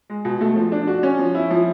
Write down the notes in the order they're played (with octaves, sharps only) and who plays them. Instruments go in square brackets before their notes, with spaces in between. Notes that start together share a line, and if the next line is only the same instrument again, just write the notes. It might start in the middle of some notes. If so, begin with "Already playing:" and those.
[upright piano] G#3
B2
A3
F3
D4
F#4
C#4
F3
E4
F3